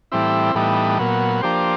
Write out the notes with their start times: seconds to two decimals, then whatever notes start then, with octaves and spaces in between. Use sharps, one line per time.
0.12 A2 E3 G3 C4 E4
0.55 A2 E3 G3 B3 D#4
0.99 A#2 F#3 B3
1.41 F3 A#3 D4 G4 C5